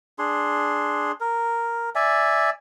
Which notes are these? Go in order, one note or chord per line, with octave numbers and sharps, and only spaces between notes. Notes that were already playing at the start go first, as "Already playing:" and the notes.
D4 G#4 C6
A#4
D5 E5 G#5